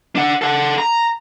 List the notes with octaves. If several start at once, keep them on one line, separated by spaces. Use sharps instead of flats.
D4 F#5
A4 F#5
A#5